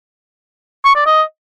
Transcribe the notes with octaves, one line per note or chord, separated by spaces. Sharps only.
C#6
D5
D#5